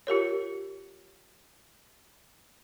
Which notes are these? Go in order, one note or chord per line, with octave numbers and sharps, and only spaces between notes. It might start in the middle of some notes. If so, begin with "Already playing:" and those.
F4 G4 A#4 C#5